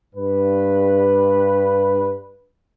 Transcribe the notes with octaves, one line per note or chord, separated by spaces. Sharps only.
G2 B4